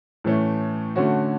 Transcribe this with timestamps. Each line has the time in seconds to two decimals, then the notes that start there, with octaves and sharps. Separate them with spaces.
0.24 A2 E3 A3 C#4
0.96 D3 A3 C#4 F#4